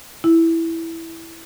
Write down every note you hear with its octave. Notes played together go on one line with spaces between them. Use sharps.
E4